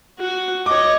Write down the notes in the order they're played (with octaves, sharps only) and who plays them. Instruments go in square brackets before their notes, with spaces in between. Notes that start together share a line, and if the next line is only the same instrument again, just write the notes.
[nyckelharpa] F#4
[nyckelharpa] C#5 D#5 [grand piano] D6